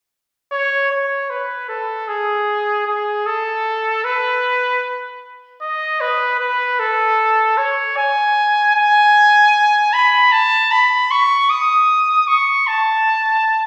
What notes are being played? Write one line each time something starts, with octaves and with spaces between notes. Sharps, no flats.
C#5
C#5
B4
A4
G#4
G#4
A4
B4
D#5
B4
B4
A4
C#5
G#5
G#5
B5
A5
B5
C#6
D#6
C#6
A5